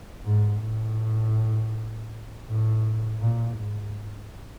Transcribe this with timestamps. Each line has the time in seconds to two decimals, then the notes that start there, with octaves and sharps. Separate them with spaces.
0.25 G#2
0.62 A2
2.47 A2
3.21 A#2
3.57 G#2